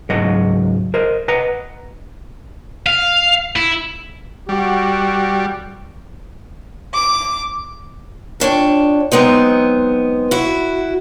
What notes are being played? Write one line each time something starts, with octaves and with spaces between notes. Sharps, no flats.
C#2 G#2 F#3 D#5 F#5
A#4 C5 D#5
B4 D#5 F#5 A#5
F5
E4
G3 F#4
D6
F2 D4 C#5 G5
F#3 G#3 B3 C4 D#4
E4 F#4